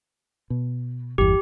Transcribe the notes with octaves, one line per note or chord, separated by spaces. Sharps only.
B2
G1 E2 G4